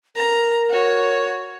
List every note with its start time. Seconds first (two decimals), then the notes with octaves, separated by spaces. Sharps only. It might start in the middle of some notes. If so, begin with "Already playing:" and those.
0.15 A#4 A#5
0.69 F#4 C#5